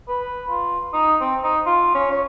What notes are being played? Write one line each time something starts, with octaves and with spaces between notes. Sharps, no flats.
B4
F4
D#4
C4
D#4
F4
C#4
C#5